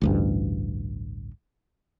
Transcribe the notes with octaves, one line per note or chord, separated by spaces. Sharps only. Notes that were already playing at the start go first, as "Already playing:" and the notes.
A1 D2 G2